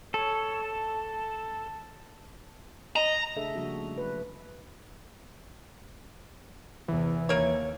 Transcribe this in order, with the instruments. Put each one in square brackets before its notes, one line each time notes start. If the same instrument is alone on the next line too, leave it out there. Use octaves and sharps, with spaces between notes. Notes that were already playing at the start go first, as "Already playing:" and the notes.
[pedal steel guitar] A4 [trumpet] C#5
[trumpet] A5
[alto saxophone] D#5 [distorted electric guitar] A#5
[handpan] C#3 A3 D4 G#4 A4 E5
C#3 F3 G3 A#3 D4 F#4
A3
F#3 B4
[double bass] E2 C3 [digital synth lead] E3
[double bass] D#2 [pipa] A#3 C#5